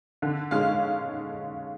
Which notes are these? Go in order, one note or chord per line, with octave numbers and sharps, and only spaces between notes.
D3
G#3 C#4 F5